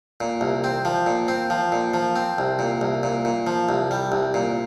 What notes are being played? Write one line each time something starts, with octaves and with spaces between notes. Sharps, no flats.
A#2
C2
C4
F3
A#2
C4
F3
A#2
F3
C4
C2
A#2
C2
A#2
A#2
F3
C2
G3
C2
A#2